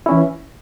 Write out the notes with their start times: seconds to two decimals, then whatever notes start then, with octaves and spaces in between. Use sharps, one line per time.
0.06 E4
0.09 C#4
0.11 E3